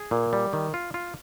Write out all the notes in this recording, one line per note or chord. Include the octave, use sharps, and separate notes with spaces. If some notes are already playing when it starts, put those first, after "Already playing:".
Already playing: G#4
A#2
G3
D#3
F4
F4